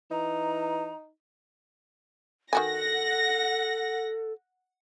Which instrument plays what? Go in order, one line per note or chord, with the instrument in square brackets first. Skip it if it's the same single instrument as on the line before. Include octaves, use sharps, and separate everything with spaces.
[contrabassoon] E3 [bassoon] D#4 [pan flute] A#5
[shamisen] D#3 F#4 G#5 [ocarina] A4 [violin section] F#5 A#6